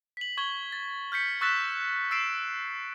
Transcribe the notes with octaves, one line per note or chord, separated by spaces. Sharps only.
B6 F#7
C#6 G#6 G7
A6
F6 G6 B6 C#7
C#6 E6 F#6 A6 B6 E7
E6 A6 C7 D7 E7